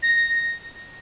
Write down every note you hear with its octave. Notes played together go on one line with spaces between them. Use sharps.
A#6